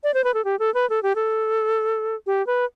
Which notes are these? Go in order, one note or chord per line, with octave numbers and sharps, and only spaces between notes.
D5
C5
B4
A4
G4
A4
B4
A4
G4
A4
G4
B4